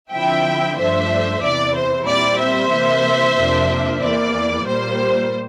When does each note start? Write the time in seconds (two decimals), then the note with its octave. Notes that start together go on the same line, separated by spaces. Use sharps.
0.12 D3 F3 C4 E4 E5 G5
0.78 G2 F3 A3 D4 C5 E5
1.42 E2 C3 E3 D5
1.76 C5
2.07 A#2 G3 C4 E4 D5
2.39 C5 E5
2.72 C3 E3 A#3
3.37 F2 C3 F3 A#3 D4
4.02 E2 E3 A#3 D5
4.66 A#2 G3 A#3 C5